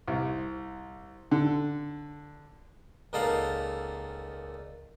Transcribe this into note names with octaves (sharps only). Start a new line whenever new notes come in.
C2
D3
C#2 A#2 D#4 A4 F5 F#5